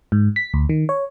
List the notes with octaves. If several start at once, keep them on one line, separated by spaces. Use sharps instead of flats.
G#2
B6
D2
D#3
C#5